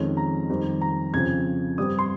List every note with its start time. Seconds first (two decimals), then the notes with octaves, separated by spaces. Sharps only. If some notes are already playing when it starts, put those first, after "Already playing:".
Already playing: F2 D#3 G#3 C#4
0.17 A#5
0.49 F2 D#3 G3 C4
0.82 A#5
1.13 F2 C#3 F3 C4 G#6
1.78 G2 G3 C4 D#6
1.99 C6